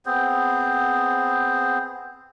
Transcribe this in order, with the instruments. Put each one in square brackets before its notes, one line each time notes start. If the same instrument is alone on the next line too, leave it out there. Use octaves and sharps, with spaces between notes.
[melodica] B3 C4 G#4 C5